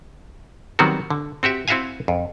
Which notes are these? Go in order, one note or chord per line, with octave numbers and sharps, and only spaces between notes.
D#3 F#3 G3 B3 C4 F#4
D3
C4 F#4 G4 E5
C4 E4 F#4 E5 F5 G#5
F2